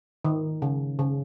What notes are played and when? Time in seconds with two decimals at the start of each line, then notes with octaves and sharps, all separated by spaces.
0.25 D#3
0.62 C#3
0.99 C#3